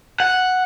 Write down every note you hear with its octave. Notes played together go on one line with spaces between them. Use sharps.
F#5